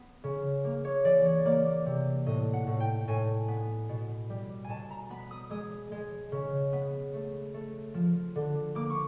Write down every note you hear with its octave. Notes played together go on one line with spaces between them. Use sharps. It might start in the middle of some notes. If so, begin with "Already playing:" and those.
Already playing: B3
C#3
A#3
C#5
E3 D5
C#5
A#3 D5
C3
A2 D#5
F#5
A2
G5
A2 G#5
B3
B2
G3
G#5
B2 A5
A#5
B3 B5
D#6
G#3 D#6
G#3
C#3
B3
A3
A3
F3
D3
A#3 D6
C#6